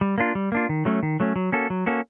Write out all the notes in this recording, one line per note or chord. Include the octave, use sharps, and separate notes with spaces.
G3
A#3 D4 F4
G3
A#3 D4 F4
D#3
F#3 A3 C#4
D#3
F#3 A3 C#4
F#3
A#3 C#4 F#4 A4
F#3
A#3 C#4 F#4 A4